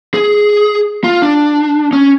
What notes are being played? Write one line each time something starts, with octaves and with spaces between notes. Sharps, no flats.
G#4
F4
D4
C#4